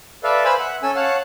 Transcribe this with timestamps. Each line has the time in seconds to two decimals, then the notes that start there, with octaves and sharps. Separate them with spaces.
0.24 A4 B4 D5 E5 F5
0.45 B4 C5 F5 G#5 B5 E6
0.59 E5 F#5
0.83 C#4 A4 G#5 E6
0.96 C#5 F5 F#5 A5